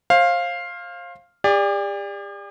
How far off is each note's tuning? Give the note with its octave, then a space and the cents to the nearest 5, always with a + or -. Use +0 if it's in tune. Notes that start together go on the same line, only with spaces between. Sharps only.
C5 +35 F5 +0
G4 +45 D5 +0